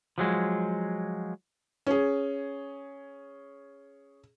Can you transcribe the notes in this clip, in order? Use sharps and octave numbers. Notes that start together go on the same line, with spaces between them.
F3 F#3 G#3
C#4 G#4